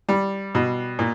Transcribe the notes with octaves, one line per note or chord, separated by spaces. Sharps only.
G3
B2
A#2